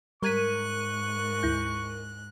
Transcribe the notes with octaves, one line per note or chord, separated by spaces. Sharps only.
G#2 G3 A#4 C#6 F#6 G#6 B6 D#7
D2 E4 G6